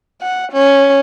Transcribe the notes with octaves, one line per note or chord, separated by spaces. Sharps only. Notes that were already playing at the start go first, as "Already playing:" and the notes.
F#5
C#4